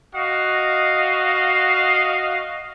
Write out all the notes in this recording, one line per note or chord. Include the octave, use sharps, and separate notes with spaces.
F#4 D#5 F5